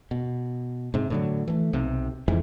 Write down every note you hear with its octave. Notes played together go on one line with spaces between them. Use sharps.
B2
G#2 C3
A2 D3 F#3
E3 A3
B1 C3
F1 F2 G#2 E3